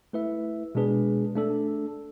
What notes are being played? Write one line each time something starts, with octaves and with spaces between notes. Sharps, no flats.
A3 E4 B4 E5
B2 G#3 D4 G#4 B4
A3 D4 A4